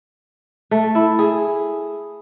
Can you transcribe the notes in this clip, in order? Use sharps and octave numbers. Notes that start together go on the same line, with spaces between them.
A3
E4
G#4